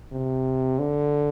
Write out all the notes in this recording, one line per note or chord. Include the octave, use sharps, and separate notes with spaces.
C3
D3